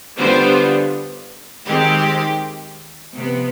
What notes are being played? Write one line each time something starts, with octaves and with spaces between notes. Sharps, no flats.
D3 G3 B3 D4 F4 C5
D#3 G#3 C4 G4
C3 F3 B3